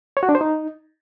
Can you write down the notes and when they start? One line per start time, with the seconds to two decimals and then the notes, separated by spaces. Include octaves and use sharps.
0.17 C#5
0.23 F#4
0.29 D4
0.35 C5
0.41 D#4